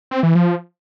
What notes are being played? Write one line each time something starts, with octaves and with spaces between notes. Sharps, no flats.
C4
E3
F3